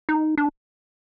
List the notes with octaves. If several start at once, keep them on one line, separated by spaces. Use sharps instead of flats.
D#4
D4